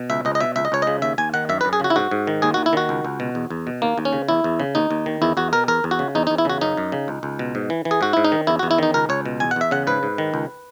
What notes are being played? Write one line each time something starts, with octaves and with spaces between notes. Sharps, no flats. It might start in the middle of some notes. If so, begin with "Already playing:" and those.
Already playing: B2
C#2 E5
C#2 D#5
D#5
B2 E5
C#2 E5
D#5
C#2 C#5
C#3 D#5
D#2 E5
D#2 G#5
D#3 F#5
F#2 E5
B4
F#2
G#4
C#3 F#4
E4
G#2 F#4
G#2
D#3
D#2 G#4
D#2 F#4
E4
D#3 F#4
C#2
C#2
B2
E2
E2
B2
D#2 A#3
D#2
C#4
C#3
E2 E4
E2
C#3
D#2 D#4
D#2
D#3
E2 E4
E2 F#4
B2 A#4
E2 A#4
E2
F#4
C#3
E2 D#4
D#4
E2
E4
C#3 F#4
F#2 D#4
F#2
C#3
C#2
C#2
B2
G#2
E3
E3
G#4
G#2 F#4
G#2 E4
D#4
D#3
E2 E4
F#4
E2
E4
D#3 D#4
C#2 A#4
C#2 C#5
B2
E2 G#5
F#5
E2 E5
C#3 F#5
G#2 B4
G#2
D#3
C#2